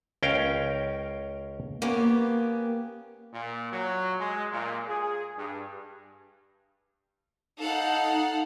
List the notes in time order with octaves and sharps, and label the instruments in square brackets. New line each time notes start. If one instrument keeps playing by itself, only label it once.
[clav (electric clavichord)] C#2 C#4 A#4 C5 F5 G5
[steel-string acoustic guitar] A#3 B3 C#4 G4
[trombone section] A#2
F#3
G#3
A#2
G#4
G2
[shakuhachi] D#4 [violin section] A4 F5 F#5